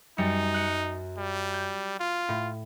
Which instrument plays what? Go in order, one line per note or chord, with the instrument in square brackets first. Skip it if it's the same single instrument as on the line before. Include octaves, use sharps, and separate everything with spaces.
[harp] F#2 G3 C#7 [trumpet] D#4
[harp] F#6 C#7
[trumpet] G3
[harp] G6
[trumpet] F4
[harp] A2